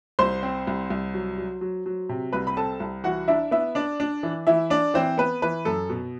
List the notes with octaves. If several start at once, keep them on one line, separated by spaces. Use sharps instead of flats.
C2 C5 C6
C4
C2
C2
F#3
F#3
F#3
F#3
C3
C2 B4 B5
B5
C4 A4 A5
C2
E3 F#4 F#5
D4 E4 E5
B3 E4 E5
D4 D5
D4
E3
E3 E4 E5
D4 D5
E3 C4 C5
B3 B4
E3 B4
F#2 A4
B2